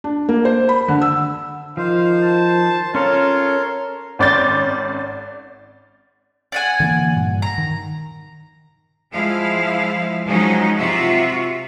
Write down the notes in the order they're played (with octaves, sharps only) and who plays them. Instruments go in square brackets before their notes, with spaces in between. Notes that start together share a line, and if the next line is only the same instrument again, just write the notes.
[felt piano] D4
A#3
C5
B5
D3
E6
[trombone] D#3 [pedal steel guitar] F3 [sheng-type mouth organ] C5 [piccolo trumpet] F5
[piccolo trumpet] A5
[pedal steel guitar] C#4 A4 F5 [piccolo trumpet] F4 [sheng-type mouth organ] A#4 C6 [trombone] C#5
[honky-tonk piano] G#1 C#4 D5 C6 G6 A6
[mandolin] D5 F#5 G#5
[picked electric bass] D3 E3 A#3
G2 A#2
[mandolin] A#5
[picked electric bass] D#3
[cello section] F3 G#3 E4 F5
F3 F#3 G#3 C#4 D#4
C3 F4 F#4 E5